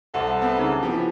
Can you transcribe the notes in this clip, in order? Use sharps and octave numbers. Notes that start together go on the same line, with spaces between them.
C2 C3 A4 F#5 C6
B3 C4
C#3 D#4 G#4 A#5
E3 F3 B3 G4